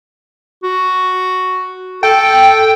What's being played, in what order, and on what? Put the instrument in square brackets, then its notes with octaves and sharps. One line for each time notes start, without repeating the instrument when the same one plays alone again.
[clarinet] F#4
[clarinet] A4 [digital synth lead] G5